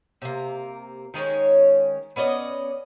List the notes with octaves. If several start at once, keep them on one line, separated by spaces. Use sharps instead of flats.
C3 A#3
D#3 G#3 C#4 C#5
B3 C#4 D5 D#5